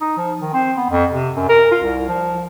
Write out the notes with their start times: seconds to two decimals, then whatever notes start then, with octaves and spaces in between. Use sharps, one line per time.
0.01 D#4
0.17 F3
0.41 D#3
0.53 C4
0.77 B3
0.90 F2
1.13 C3
1.36 F#2
1.49 A#4
1.71 F4
1.83 C2
2.08 F3